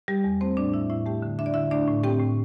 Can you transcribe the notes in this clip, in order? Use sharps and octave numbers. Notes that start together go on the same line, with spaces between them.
G3 G4
E2
A3 C4 C5
A2 D4 D5
D4 E4 E5
A2 E4 E5
A3 G4 G5
D3
D4 E5
D5
D3 E4 E5
A3 D4 D5
A2
C4 G4 G5
A2